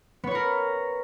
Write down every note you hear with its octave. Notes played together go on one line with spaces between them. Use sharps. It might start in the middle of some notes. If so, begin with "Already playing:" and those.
B3 A#4 B4 C#5